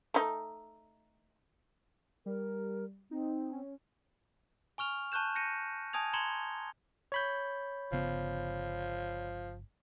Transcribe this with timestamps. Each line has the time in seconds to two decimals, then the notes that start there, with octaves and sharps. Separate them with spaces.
0.14 A3 D#4
2.26 G3 A#4
3.11 C4 D#4
3.52 C#4
4.78 G#5 C#6 F6 F7
5.12 A5 C#6 F#6 G6 E7
5.35 G6 A#6 C#7 D#7
5.93 G#5 A5 D#6 G#6 F7
6.13 A#5 C6 G#6 C#7 F7 G7
7.12 C#5 B5 G6
7.92 G1 C#3 F3 B3